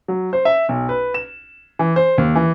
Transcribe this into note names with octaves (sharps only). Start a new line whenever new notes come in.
F#3
C5
E5
B1
B4
E7
E3
C5
D#2
E3